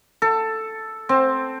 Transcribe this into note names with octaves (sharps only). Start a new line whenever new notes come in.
A4
C4